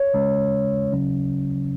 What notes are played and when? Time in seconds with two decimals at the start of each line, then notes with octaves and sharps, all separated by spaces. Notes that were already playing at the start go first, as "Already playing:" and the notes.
Already playing: C#5
0.14 C#3 G#3 C#4
0.93 C#3 F#3 C#4